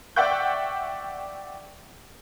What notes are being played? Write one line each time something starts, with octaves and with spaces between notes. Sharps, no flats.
D5 E5 F#5 G5 C#6 G6